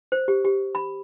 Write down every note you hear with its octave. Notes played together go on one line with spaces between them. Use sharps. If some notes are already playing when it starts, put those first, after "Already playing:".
C5
G4
G4
B5